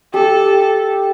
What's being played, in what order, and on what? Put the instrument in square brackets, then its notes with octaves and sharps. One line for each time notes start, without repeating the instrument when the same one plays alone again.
[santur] G4 [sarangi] A4